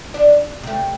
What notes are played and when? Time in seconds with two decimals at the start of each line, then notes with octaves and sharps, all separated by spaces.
0.14 D4
0.63 C3 A3